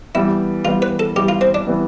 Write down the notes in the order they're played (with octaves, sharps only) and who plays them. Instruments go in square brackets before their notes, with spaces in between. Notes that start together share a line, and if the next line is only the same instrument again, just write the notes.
[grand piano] E3 G3 B3 [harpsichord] E4
[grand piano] E3 G3 B3 [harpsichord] F4
[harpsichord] B4
A4
[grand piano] E3 G3 B3 [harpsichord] G4
[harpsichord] F4
C4
D4
[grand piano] E3 G3 B3